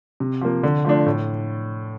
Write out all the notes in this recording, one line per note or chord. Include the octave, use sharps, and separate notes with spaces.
C3
F3 A#3
D3
F3 A3 D4
A2